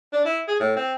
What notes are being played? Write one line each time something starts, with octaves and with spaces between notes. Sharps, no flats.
D4
E4
G#4
A2
C4